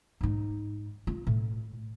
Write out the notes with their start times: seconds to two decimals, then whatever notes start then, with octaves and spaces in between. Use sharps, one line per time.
0.21 G#2 D#4
1.07 F4
1.27 A2